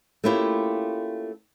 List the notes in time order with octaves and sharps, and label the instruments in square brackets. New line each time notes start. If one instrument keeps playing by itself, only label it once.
[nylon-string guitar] A3 A#3 C#4 E4 F4 G4